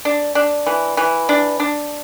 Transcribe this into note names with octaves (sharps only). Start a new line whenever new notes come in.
D4
D4
E3
E3
D4
D4